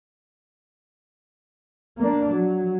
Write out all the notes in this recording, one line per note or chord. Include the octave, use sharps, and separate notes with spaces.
A#3 D4
F#3